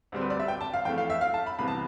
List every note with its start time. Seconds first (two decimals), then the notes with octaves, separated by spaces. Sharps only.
0.12 D2 D3 G3 C4
0.21 B4
0.30 D5
0.39 E5
0.48 G5
0.61 A5
0.73 F5
0.85 F2 E3 A3 G5
0.98 F5
1.10 E5
1.21 F5
1.34 A5
1.46 B5
1.59 C2 C3 E3 B3 B5
1.68 A5